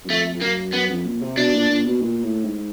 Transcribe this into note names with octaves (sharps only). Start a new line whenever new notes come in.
F#2
F2 A3
F2
F#2 A#3
F#2 B3
F2
A#2
C3
B2 D4
A#2
A#2
B2
A#2
A2
G#2